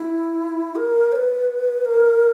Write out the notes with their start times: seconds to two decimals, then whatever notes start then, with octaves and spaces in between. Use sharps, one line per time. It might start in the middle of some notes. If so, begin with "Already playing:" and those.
Already playing: E4
0.76 A#4
1.12 C#5
1.15 B4
1.85 A#4